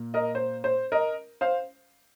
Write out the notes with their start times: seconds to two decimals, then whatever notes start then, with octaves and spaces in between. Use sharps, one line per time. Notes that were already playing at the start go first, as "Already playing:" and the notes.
Already playing: A#2 A#3
0.14 A#4 D#5
0.35 C5
0.64 C5
0.92 A#4 D#5
1.41 C5 F5